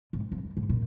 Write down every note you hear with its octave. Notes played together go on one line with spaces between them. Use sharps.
G#2
F2
F#2
G#2
A#2